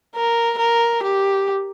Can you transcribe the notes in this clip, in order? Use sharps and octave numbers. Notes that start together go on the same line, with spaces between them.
A#4
A#4
G4